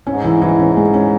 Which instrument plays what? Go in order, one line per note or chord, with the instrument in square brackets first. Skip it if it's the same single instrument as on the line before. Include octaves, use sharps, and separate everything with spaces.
[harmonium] G#2 [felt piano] C#4
[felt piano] E3
E3
C#4
G#3
C#4